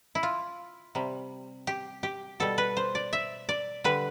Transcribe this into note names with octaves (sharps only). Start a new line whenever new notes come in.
E4
F4
C3 G3
G4
G4
B2 G3 A4
B4
C5
D5
E5
D5
D3 G3 B4